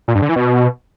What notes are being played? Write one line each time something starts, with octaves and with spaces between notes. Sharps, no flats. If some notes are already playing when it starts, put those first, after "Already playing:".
A#2
G2
D3
E3
B2